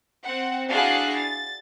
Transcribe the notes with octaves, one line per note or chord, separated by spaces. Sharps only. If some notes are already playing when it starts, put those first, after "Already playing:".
C4 F#5
D4 E4 F#4 G#4 F5 F#6
A6